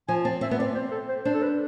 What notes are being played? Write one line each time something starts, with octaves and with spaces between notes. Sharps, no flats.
F3 G#5
C4 A5
C4 E5
B3
C4 D5
C5
A4
C5
D4 C5
A4
B4